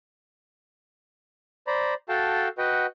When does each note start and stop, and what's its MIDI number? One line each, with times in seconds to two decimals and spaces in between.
1.67 1.94 72
1.67 1.94 74
1.67 1.94 82
1.67 1.94 83
2.09 2.48 66
2.09 2.48 69
2.09 2.48 77
2.09 2.48 79
2.09 2.48 81
2.58 2.86 66
2.58 2.86 71
2.58 2.86 75
2.58 2.86 78
2.58 2.86 79